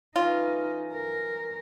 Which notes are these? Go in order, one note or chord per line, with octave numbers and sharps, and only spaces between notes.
E3 C#4 D#4 F4 A4
A#4